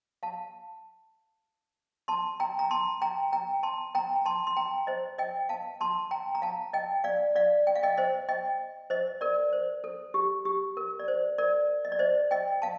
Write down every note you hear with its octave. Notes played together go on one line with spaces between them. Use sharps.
F5 A5
A5 C6
G5 A#5
A#5
A5 C6
G5 A#5
G5 A#5
A5 C6
G5 A#5
A5 C6
C6
G5 A#5
C5 D#5
D#5 G5
F5 A5
A5 C6
G5 A#5
A#5
F5 A5
D#5 G5
D5 F5
D5 F5
G5
F5
D#5 G5
C5 D#5
D#5 G5
C5 D#5
A#4 D5
C5
A4
G4
G4
A#4
D5
C5
A#4 D5
D#5
D5
C5 D#5
D#5 G5
F5 A5